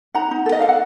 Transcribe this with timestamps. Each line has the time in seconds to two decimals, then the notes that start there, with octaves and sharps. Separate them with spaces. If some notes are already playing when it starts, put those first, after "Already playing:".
0.15 D#4 F#5 A#5
0.31 D#4
0.46 A4
0.52 D#5
0.60 A4 F5
0.69 F#5